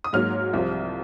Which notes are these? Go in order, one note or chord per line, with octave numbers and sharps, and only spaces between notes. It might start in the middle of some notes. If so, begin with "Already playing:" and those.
D#6
G#2 F#3 A#3 F6
C2 C3 F3